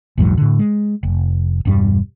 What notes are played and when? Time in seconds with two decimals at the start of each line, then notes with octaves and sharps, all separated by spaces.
0.18 A#1 E2 G#2 F#3
0.37 A2 D3
0.59 G#3
1.03 F1
1.65 E1 G2 G3